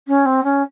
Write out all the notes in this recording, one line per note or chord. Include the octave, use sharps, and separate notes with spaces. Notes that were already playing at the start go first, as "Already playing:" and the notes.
C#4
C4
C#4